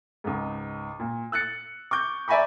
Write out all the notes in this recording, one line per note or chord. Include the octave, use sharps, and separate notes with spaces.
C#2 G#2
A#2
E6 F#6 A6 C#7
C#6 D6 G6
D5 E5 G#5 A#5 B5 C#6